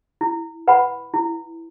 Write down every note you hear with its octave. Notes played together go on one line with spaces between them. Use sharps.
E4
B4 F#5 B5
E4